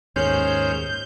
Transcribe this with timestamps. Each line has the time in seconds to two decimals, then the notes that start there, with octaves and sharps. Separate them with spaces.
0.16 D#2 G#2 C#4 C5 F6 G6